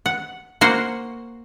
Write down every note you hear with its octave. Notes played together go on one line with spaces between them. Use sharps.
F#5
A#3 F#4 C5 F#5